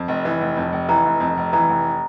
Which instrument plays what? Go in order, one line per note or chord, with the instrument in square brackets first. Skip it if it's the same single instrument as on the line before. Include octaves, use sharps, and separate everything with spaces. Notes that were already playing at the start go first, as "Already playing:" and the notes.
Already playing: [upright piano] F2
F1
E3
F1
F2
F1
[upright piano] E3 [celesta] A#5
[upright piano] F1
F2
F1
[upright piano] E3 [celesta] A#5
[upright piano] F1